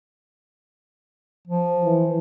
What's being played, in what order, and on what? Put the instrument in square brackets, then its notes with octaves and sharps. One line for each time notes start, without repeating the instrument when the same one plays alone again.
[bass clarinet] F3
[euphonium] E3